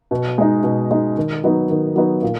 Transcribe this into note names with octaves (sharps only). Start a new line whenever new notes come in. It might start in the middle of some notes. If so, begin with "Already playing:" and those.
B2
G#3 D#4
B2
G#3 D#4
D#3
F#3 B3 D#4
D#3
F#3 B3 D#4
A#2